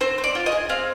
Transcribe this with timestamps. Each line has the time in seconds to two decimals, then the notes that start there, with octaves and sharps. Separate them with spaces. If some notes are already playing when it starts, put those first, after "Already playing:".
0.01 C4 C5
0.18 C4
0.24 D5
0.35 F4
0.46 D#5
0.52 G#4
0.69 C4 F5